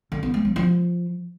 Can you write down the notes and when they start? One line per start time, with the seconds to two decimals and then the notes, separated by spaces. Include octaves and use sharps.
0.12 D3
0.23 B3
0.34 G#3
0.45 F#3
0.56 F3